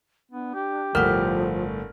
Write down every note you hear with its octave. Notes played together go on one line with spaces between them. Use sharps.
B3 D4
G4
G1 A2 F3 A#4 F#5 F6